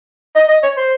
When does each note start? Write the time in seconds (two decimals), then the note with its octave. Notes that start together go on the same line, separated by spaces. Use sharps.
0.35 D#5
0.48 D#5
0.63 C#5
0.77 C5